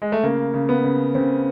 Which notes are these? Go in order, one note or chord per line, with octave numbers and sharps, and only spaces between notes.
G#3
A3
C#3 A#3
C#3
B3
C#3
C#3 C4